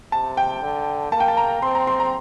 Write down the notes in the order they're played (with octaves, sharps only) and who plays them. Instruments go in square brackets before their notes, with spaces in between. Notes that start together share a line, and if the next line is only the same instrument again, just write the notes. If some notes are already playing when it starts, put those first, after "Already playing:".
[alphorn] C3 [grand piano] A5
[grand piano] G5
[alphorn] D3
[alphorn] A#3 [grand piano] A5
[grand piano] G5
A5
A#5
[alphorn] C4 [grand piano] C6
[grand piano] A#5
C6
A#5